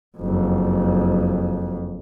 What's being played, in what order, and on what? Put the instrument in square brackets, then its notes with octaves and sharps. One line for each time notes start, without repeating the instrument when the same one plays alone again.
[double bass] F#1 F2